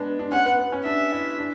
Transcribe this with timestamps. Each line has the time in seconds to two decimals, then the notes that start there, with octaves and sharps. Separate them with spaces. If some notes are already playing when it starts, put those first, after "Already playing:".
Already playing: G#3 B3 D4
0.19 D4
0.32 C#4 F#5
0.46 B3
0.58 B3
0.72 C#4
0.84 D4 E5
1.12 E4
1.38 D4